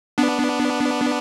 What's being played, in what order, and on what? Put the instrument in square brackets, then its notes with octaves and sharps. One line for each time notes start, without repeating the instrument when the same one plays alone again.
[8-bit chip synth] B3 D4